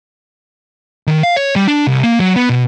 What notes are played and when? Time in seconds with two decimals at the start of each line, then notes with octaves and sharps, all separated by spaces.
1.07 D#3
1.23 F5
1.36 C#5
1.56 G3
1.68 D4
1.87 C2
2.03 A#3
2.20 F#3
2.36 B3
2.50 B2